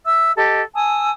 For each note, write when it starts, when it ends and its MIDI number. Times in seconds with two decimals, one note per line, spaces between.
0.06 0.32 76
0.06 0.32 88
0.36 0.61 67
0.36 0.61 69
0.36 0.61 75
0.75 1.10 80
0.75 1.10 81
0.75 1.10 87
0.75 1.10 88